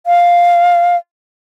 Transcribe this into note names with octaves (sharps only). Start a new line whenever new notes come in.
F5